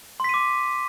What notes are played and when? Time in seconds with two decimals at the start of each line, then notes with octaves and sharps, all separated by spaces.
0.20 C6
0.24 B6
0.29 D#7
0.34 D6